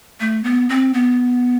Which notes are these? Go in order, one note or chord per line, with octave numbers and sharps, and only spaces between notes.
A3
B3
C4
B3